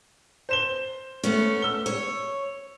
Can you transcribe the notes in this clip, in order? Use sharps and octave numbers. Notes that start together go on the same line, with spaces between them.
C5 E7 G7
A3 B3 C#4
E6 G7
C#5